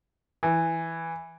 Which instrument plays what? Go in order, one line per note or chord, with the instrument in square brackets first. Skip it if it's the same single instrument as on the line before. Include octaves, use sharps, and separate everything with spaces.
[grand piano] E3